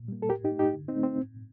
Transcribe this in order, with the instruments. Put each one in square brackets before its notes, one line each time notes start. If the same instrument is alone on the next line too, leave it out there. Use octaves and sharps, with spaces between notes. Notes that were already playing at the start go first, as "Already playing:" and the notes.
Already playing: [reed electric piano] A#2
G3 A#3
A4
A2 G4 A#4
D#4 G4
A3
D#4 G4
D3
C4 D#4
A3
C4
A2